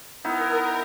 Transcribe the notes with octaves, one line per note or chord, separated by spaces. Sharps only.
B3 D#4 E4 A#4